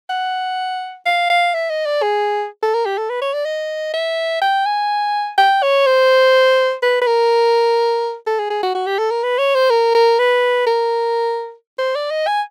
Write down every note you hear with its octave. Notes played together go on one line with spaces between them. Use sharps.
F#5
F5
F5
E5
D#5
D5
G#4
A4
A#4
G4
A4
B4
C#5
D5
D#5
E5
G5
G#5
G5
C#5
C5
B4
B4
A#4
A4
G#4
G#4
F#4
F#4
G4
A4
A#4
B4
C#5
C5
A#4
A#4
B4
A#4
C5
D5
D#5
G#5